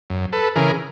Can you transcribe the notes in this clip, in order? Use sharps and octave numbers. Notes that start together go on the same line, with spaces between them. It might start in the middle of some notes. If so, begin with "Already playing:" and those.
F#2
A4 B4
C#3 E3 G#4 A#4